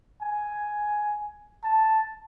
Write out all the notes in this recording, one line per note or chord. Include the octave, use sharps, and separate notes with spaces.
G#5
A5